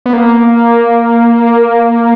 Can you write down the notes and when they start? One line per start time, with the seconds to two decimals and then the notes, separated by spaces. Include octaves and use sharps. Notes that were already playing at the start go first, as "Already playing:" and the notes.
0.06 B3
0.13 A#3